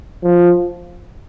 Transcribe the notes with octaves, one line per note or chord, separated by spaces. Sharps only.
F3